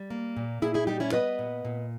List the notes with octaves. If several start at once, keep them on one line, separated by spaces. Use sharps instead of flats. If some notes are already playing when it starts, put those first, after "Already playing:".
Already playing: G3
A#3
A#2
A#2 E4 G#4
E4 G#4
G3 D#4 G4
C#4 E4
B3 B4 D#5
A#2
A#2